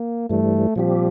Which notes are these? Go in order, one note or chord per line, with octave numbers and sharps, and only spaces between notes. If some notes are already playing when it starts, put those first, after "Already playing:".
Already playing: A#3
G2 E3 G3 A3
A#2 F3 G3 C4 G4